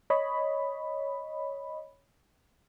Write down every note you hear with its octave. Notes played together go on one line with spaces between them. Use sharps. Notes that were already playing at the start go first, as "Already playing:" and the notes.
C#5 D#5 B5